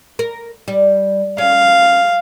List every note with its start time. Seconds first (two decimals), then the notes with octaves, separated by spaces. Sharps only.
0.19 A#4
0.68 G3
1.38 C#4 F5